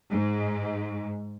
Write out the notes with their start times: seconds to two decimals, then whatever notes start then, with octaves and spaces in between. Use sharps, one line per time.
0.12 G#2